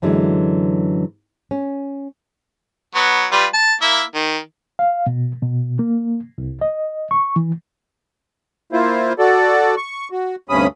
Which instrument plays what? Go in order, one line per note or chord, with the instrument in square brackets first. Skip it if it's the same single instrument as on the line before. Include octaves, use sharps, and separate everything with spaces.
[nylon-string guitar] F#2 D3 E3 F#3 G#3
C#4
[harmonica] F#3 B3
G3 F4 B4
A5
A#3 E4 E5
D#3
[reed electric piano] F5
B2
B2
A#3
C2
D#5
C#6
E3
[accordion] A#3 E4 F4 C5
F#4 A4 D5
C#6
F#4
D2 G2 C3 C#4 B5 D#6